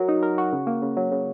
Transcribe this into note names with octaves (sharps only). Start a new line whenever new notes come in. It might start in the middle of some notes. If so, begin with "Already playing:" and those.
Already playing: F#3 F#4 A#4
D#4
A#4
F#4
C#3
A#3
C#3
F#3
C#3